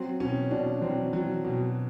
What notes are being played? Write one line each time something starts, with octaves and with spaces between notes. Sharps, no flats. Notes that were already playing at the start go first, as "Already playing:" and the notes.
Already playing: F#3 C4
B2 C#4
B2 D4
F#3 C4
F#3
B2